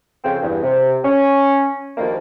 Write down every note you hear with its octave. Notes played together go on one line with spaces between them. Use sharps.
F2 C#3 C4
E2 G2
C3
C#4
D2 D3 D#3 F3 G3 A#3